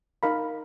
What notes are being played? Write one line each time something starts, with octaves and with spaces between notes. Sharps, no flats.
D#4 A#4 F5 B5